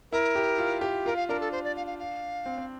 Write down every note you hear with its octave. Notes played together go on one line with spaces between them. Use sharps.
E4 A#4
G4
F4
G4
F4 A#4
F5
D4 A#4
A4
C5
D5
F5
F5
F5
C4
C4